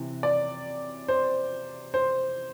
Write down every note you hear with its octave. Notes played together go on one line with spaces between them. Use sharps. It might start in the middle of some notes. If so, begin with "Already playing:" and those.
Already playing: C3 E3
D5
C5
C5